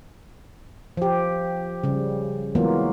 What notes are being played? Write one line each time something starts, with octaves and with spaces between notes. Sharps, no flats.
F3 G4
C#3 G3
E3 F#3 G#3 A#3 B3 F4